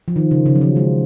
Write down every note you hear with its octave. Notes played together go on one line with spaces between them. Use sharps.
F3
D#3
C#3
C#3
F#3
F3
G#3